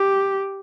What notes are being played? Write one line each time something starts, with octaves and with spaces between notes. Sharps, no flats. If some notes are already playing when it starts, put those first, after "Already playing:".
Already playing: G4